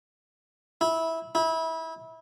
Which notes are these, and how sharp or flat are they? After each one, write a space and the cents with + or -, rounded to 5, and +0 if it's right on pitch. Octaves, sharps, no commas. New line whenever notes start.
E4 -15
E4 -25